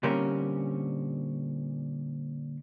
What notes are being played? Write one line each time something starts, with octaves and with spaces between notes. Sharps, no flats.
A#2 D3 G3 C4 C#4 A#4